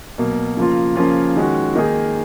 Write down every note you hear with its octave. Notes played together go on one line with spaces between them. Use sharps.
B2 F#3 A#3
C#3 F3 A#3 F4
C#3 F3 A#3 C#4 F4
D#3 G#3 C#4 F#4
D#3 A#3 D#4 G#4